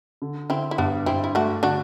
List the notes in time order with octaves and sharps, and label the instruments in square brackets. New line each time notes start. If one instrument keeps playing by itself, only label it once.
[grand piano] D3
[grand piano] D3 [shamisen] C4 E4
[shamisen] E4
[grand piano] G2 [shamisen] B3 D4
[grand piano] G2 [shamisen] C4 E4
[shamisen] E4
[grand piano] A3 [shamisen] D4 F#4
[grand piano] D3 [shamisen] D4 F#4